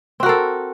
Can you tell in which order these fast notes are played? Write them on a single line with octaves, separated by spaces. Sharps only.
C4 F#4 A#4 A4